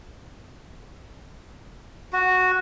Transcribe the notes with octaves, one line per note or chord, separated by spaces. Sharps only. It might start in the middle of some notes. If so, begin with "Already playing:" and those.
F#4